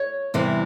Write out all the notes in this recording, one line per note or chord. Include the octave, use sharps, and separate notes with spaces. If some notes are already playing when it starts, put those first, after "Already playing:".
Already playing: C#5
E2 C3 E3 G3